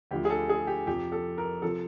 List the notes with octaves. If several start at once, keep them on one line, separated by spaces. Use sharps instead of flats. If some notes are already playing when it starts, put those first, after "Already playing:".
D2 D3 F3 G4
G#4
A4
G#4
G4
F2 C3 F3 G4
A4
A#4
C3 F3 A4